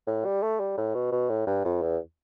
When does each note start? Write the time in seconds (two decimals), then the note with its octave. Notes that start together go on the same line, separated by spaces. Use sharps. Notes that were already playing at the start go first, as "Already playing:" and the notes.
0.07 A2
0.25 G3
0.43 A3
0.60 G3
0.78 A2
0.95 B2
1.12 B2
1.29 A2
1.47 G2
1.65 F2
1.82 E2